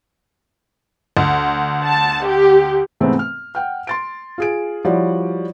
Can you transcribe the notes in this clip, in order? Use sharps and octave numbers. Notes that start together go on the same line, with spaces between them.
D2
A5
G4
G#2 C3 E3 A3 B3 C4
F6
F#5 G5 F6
C6 A6 D7
F4 G#4 D7
F3 G3 E4 F#4 C#5 D5